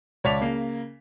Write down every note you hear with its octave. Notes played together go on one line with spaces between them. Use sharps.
C#2 C#5 D5 A5 B6 F7
C#3 A#3